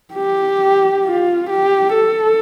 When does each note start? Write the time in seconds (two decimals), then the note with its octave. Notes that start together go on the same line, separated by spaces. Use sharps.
0.14 G4
1.05 F4
1.50 G4
1.95 A4